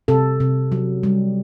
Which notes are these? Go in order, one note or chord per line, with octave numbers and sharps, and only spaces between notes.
C3 A4
C3
F#3
G3